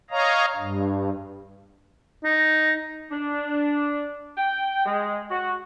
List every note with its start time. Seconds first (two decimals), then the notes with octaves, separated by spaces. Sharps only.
0.11 C#5 D#5 F5 A#5
0.56 G2
2.24 D#4
3.11 D4
4.37 G5
4.86 G#3
5.31 F#4